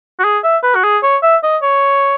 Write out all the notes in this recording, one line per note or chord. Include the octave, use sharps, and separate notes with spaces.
F#4
G#4
E5
B4
F#4
G#4
C#5
E5
D#5
C#5